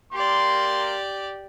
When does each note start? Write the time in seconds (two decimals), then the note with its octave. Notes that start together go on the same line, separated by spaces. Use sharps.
0.13 A#3 G4 A#4 D5 C6